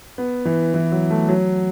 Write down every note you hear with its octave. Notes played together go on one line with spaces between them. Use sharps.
B3
E3
E3
F#3
A3
F#3